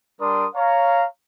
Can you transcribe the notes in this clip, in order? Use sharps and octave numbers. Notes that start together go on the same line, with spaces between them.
G3 D4 A#4 D5 C6 D#6
C#5 F5 A#5